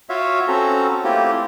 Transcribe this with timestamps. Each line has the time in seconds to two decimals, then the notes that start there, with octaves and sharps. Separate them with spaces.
0.10 F4 F#4 C#5 E5 F5
0.48 C4 C#4 F#4 A4 A#5
1.04 A3 A#3 C4 E4 F4 G4